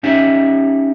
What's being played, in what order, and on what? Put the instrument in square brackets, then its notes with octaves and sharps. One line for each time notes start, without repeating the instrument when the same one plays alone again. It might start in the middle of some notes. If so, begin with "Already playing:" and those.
[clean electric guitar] C#4 D#4 G4 E5